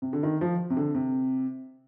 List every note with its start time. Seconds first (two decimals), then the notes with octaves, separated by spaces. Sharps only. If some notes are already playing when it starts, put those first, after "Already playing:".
0.02 C3
0.13 D3
0.23 D#3
0.41 F3
0.70 C3
0.77 D3
0.94 C3